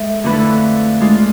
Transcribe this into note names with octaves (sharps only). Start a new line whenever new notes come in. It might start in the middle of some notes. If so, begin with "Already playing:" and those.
Already playing: G#3 A4 E5
F2 D3 A3 E4 B4
G#3 D4 F4